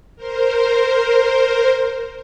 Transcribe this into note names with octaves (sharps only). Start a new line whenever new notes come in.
A#4 C5